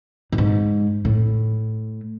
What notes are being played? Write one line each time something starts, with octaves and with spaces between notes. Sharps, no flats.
A2
G#2
A2